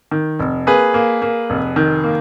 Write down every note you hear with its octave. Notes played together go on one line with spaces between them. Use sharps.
D#3
F1
A#3 G#4 B4
A#3
A#3
F1
D#3
A#3